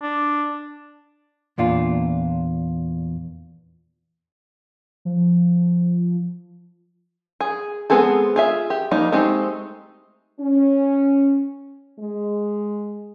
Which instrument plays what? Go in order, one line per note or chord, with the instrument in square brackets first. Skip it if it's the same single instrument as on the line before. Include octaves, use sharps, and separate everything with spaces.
[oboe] D4
[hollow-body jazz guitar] E2 A#2 D4 F4
[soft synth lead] F3
[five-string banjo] G#4
G#3 B3 C4 G#4 A4
F4 G#4 E5
G4
F3 G3 A#3 D#4
G#3 A3 C4 D#4 G4
[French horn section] C#4
G#3